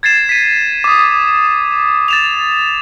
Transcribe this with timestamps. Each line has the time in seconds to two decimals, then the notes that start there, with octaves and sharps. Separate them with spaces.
0.03 G#6 A6 C7 E7
0.29 B6 D#7
0.84 D6 D#6
2.08 A6 E7 F7